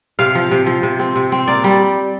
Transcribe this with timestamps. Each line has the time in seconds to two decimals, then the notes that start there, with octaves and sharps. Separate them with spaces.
0.19 C3 F5
0.35 F3
0.51 C3
0.66 F3
0.83 C3
0.99 C4
1.16 C3
1.32 C4
1.48 A#3 D5
1.64 G3